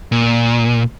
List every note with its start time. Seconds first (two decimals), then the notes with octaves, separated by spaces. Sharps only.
0.12 A#2